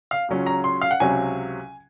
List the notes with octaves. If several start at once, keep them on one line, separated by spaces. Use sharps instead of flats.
F5
C#2 C#3 F#3 C#4 F4
A#5
C6
F5
F#5
C#2 C3 F#3 C#4 G#5